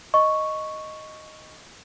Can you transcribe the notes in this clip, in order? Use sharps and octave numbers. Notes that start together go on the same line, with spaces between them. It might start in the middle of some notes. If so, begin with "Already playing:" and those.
D#5 C#6